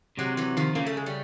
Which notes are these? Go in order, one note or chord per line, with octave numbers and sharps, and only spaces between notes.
C3 F#3 G#3
E3 F#3
D#3 F3
C#3 A#3
A3
G#3
G3 A3